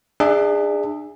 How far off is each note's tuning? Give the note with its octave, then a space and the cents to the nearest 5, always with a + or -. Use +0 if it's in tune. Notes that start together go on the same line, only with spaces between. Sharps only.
D4 +30 G#4 -15 E5 +0